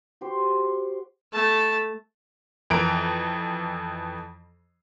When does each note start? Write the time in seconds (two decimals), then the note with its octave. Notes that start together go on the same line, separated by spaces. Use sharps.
0.21 F#4 G4 C5
1.33 A3 A5
2.70 F2 E3 A#5 D7